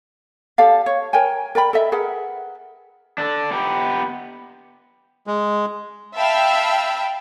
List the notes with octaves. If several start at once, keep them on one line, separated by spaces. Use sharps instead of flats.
G4 A4 D5 F5
C#5
A#4 C#5 G5 G#5
A#4 D5 G5 B5
A4 D#5 E5
G#4 A#4 B4 F#5
D4 A4
B3 G4
G#3
E5 F5 G5 A5 B5 E6